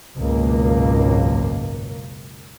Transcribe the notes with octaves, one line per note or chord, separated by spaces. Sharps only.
G#1 C#2 F#2 B2 A#3